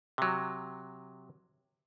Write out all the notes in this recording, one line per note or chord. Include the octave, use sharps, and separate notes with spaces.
C3 F#3